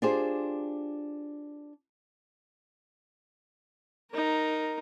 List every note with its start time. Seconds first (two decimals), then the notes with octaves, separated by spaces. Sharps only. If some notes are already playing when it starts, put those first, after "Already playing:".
0.02 D4 F4 G4 G#4 C5
4.11 D#4 A#4